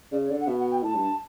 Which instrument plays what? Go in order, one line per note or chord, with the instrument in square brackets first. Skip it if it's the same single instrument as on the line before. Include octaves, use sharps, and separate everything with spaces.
[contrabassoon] C#3 [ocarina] D5
[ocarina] C#5
[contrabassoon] D3 [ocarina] D5
[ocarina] F#5
[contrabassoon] B2 [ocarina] E5
[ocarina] F#5
G5
[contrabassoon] A2 [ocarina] A5
[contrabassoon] G2